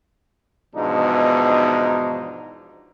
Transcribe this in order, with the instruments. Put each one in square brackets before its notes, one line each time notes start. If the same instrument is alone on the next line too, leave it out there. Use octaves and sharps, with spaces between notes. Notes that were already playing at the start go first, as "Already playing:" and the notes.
[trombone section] E2 G#2 B2 F3 D4 D#4